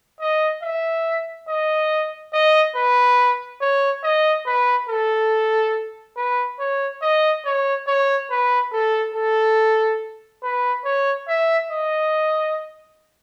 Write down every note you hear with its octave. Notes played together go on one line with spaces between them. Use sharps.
D#5
E5
D#5
D#5
B4
C#5
D#5
B4
A4
B4
C#5
D#5
C#5
C#5
B4
A4
A4
B4
C#5
E5
D#5